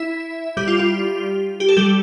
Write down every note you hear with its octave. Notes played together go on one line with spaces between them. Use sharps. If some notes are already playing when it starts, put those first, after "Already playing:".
Already playing: E4 E5
G3 G4
F4
F4
G4
A4
G3 G4